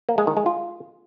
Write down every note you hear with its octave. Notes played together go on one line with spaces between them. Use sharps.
A#3
G#3
D#3
G#3
F4